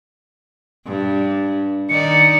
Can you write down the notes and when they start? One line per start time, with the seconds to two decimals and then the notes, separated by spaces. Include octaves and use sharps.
0.86 G2
1.89 D#3 D#4 D5 C#7